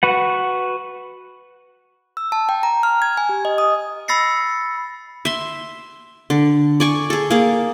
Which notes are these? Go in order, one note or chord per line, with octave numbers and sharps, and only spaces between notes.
F#4 B4 F#5
E6
A5
G5
A#5
F6
G#6
G#5
G4
D#5
D#6
B5 E6 A6 A#6 C7 C#7
E5 C6
D3
D5 G#5 C#6
G#4 A4
A#3 G#4